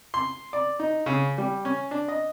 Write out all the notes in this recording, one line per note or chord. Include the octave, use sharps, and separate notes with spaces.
C6
D5
D#4
C#3
G3
C#4
D4
D#5